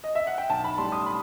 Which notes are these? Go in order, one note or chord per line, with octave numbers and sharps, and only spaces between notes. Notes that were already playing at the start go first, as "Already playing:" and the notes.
D#5
E5
F#5
G5
B1 A5
B5
A2 G3 C6
D#6
B5